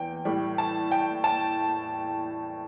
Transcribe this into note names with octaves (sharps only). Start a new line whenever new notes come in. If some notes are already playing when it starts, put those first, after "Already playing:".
Already playing: E2 G5
A2 G3
A5
G5
A5